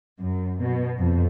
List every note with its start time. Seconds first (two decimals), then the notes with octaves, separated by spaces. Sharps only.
0.20 F#2
0.62 B2
0.98 F2